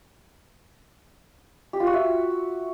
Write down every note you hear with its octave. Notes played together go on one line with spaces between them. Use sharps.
G4
F4
F#4
E5